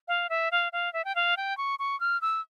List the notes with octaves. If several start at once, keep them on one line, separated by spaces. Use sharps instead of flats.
F5
E5
F5
F5
E5
G5
F5
G5
C#6
C#6
F6
E6